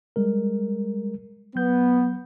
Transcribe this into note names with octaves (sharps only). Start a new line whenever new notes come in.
G3 G#3 A#4
F#3 B3 G6